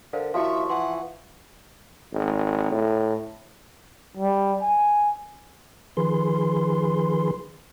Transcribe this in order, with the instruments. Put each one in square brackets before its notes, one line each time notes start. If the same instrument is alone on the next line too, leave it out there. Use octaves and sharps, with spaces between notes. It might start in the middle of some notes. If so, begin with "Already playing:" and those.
[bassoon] D3 [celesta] A#4 C5 F5
[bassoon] D#2 [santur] F3 C#6 [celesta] E4 F#4 F5 [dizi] E5
[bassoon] E3 [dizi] F#5 [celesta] C6
[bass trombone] G#1
A2
[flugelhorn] G3
G#5
[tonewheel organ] D#3 F3 G#4 B4 C6